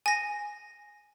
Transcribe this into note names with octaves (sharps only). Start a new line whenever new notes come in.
G#5 A#6